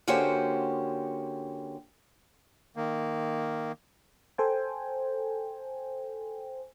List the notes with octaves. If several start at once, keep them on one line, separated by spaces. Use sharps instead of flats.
D3 A#3 C#4 F#4 G4 C5
D#3 A#3
A4 C5 G5 G#5